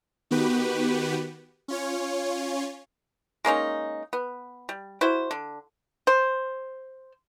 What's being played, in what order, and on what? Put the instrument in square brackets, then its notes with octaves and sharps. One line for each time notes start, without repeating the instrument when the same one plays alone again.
[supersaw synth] D#3 B3 F#4 G4 B4
C#4 F4 C#5
[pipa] G#3 A#3 C#4 D#4
B3
G3
E4 F#4 C5
D3
C5